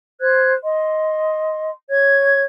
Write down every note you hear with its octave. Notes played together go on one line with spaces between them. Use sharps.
C5 F#6 G#6
D#5 C6
C#5 G#6